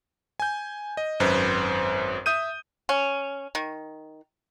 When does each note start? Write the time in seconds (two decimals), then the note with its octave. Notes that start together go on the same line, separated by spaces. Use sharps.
0.40 G#5 G6
0.97 D#5
1.20 G#1 F#2 B4 C5
2.26 E5 D#6 G6 D#7
2.89 C#4
3.55 D#3